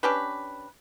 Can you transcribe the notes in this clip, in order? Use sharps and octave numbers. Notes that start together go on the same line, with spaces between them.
C#4 D4 G4 B4